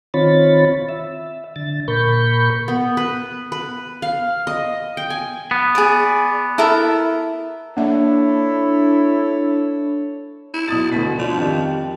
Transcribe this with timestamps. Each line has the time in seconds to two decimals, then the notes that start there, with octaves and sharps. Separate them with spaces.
0.14 D#3 C4 F4 C#5 B5 A6
0.89 E5
1.56 D3 A6
1.88 A#2 A#4 B5 C#6 G6
2.68 B3
2.97 B4
3.52 B4
4.02 F5
4.47 D#5
4.97 G5
5.10 G#5
5.51 B3
5.75 G#4 D5
6.58 E4 A4 A#4
7.77 A#3 D4 E4 A4 C#5 E5
10.54 E4
10.68 B1 D#6 A6
10.91 D2 B2 B6
11.19 F3 D4 F4
11.37 F2 D#3 G3